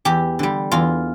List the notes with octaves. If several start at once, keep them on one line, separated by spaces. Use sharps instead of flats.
E2 G4
D3 G3
E2 F4